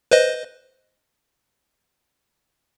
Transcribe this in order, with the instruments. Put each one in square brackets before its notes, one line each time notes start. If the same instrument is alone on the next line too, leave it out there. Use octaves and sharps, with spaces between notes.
[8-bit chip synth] B4 C5 D#5